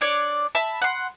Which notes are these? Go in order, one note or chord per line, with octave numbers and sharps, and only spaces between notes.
D4 C#5 D5
E5 A5 B5
F#5 C6